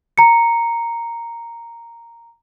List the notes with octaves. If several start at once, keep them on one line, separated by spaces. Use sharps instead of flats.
A#5 C#7